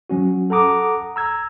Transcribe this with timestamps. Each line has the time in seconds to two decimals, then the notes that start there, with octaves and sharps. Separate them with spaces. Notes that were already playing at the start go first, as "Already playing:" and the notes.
0.10 F#3 C#4 F#4
0.50 A4 F#5 A#5 D6 D#6
1.16 A#5 E6 G#6